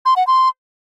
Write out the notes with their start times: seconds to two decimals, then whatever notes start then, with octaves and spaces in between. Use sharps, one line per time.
0.06 C6
0.16 F#5
0.27 C6